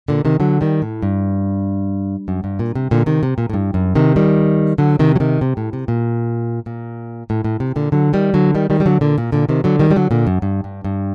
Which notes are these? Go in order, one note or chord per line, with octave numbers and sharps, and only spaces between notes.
A#2 D3
C3 D#3
D3 F#3
D#3 G3
A2
G2
F#2
G2
A#2
C3
A#2 D3
C3 D#3
C3
A#2
A2
G2
F#2
C3 D#3
D#3 G3
D3 F#3
C3 D#3
F#3
C3 D#3
C3
A2
C3
A#2
A#2
A2
A2
C3
A#2 D3
D3 F#3
D#3 G3
D3 F#3
D#3 G3
D#3 G3
G3
D3 F#3
A#2 D3
A#2
A#2 D3
C3 D#3
D3 F#3
D#3 G3
G3
D3 F#3
A#2 D3
F#2
G2
G2
G2